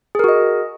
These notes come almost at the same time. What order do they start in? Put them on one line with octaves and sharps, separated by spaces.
G#4 A#4 F#4 D#5